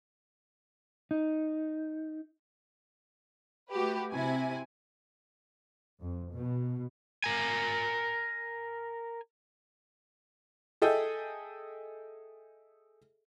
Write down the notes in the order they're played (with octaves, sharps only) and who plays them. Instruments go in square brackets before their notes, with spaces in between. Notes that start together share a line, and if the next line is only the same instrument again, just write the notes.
[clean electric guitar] D#4
[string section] A3 F#4 G4 B4
C3 E4 G#5
[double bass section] F2
B2
[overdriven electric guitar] A#4 G#5
[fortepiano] G#4 A4 D#5 E5 G5